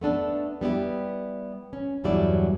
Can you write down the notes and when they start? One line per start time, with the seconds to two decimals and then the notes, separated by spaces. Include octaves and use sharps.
0.01 A3 B3 D4 A4
0.61 G3 B3 E4 G4
1.73 C#4
2.04 E2 G2 F#3 G3 E4 D5